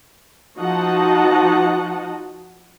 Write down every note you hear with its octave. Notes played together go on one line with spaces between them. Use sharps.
F3 D#4 F#4 D#5 F#5 A5